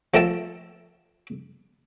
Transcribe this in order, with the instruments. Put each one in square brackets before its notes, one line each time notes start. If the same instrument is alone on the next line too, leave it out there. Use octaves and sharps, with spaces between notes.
[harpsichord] F3 A3 A#4 E5 G5 A5